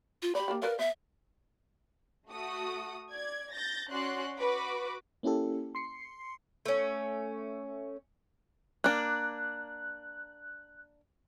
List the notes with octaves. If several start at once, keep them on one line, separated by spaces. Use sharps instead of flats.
F4
G4 D5 B5
A#3 D4 G4
A#4 B4 D5 F5
B3 E5
A3 F#4 D#6
D5 G#6
G6 A6 A#6
C#4 F#4 D5 C6 F#6
F#4 B4 D6
A#3 C#4 E4 G4 A4
C6 C7 C#7
A3 C#4
A#3 D4 F#6